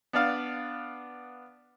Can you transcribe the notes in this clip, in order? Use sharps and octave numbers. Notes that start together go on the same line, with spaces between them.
B3 D4 F5